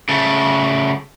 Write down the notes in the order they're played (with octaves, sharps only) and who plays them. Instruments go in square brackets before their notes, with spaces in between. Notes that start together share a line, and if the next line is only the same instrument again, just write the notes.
[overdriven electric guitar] C#3 A3